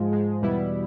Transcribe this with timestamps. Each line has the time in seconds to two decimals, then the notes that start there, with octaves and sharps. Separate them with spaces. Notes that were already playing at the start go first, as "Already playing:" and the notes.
Already playing: G#2 F3 G#3
0.12 G#2 F3 G#3
0.42 E2 B2 G3 B3 E4